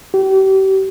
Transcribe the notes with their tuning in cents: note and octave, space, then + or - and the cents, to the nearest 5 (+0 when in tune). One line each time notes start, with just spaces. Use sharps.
G4 -35